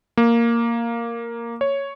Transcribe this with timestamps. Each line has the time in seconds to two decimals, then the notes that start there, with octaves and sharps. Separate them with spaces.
0.17 A#3
1.61 C#5